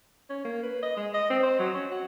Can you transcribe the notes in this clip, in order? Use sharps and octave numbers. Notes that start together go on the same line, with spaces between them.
C#4
A#3
B4
D#5
G#3
D#5
C4
C5
F#3
C#4
F#4